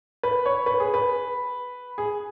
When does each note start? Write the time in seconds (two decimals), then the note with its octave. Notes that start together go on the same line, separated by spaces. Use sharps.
0.23 B4
0.46 C#5
0.66 B4
0.80 G#4
0.94 B4
1.98 G#4